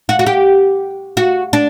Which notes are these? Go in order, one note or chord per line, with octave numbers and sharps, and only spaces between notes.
F#4
F#4
G4
F#4
D4